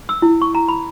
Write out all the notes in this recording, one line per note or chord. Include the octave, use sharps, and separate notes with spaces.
E6
E4
C#6
A#5
B5